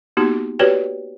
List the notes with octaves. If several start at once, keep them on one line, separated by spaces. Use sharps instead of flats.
A#3 B3 D#4 F#4 G4
F#4 G4 B4 C#5 D5 G5